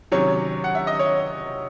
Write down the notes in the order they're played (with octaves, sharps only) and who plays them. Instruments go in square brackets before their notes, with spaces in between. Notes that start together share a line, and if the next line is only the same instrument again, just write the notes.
[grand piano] C3 D#3 F#3 C#4 C#5
F#5
E5
D#5
C#5